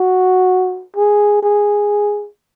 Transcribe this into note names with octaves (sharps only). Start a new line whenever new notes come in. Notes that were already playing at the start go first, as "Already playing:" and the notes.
Already playing: F#4
G#4
G#4